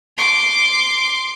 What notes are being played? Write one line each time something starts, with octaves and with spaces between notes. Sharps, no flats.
C6 D6